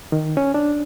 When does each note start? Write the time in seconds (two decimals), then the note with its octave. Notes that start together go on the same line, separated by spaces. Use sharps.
0.12 D#3
0.37 C#4
0.54 D4